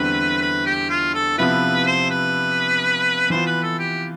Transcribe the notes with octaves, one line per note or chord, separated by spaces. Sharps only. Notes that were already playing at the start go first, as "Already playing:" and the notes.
Already playing: E2 D3 G3 C4 E4 B4
B4
G4
F4
A4
C3 F3 B3 E4 B4
C5
B4
E3 B3 F4 C5
B4
A4
G4